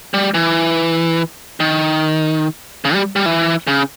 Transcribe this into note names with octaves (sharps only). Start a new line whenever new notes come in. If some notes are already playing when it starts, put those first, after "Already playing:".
G3
E3
D#3
C#3
G3
G3
E3
C#3